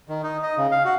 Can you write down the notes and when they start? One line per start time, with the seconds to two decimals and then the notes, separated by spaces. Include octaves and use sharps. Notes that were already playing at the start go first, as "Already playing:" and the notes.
0.09 D#3
0.23 D#4
0.43 D#5
0.58 C#3
0.71 F5
0.85 F#4